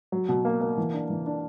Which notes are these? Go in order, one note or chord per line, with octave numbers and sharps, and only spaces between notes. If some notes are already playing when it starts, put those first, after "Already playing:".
F#3
B2
A#3
A#3
E3
D4
E3
D4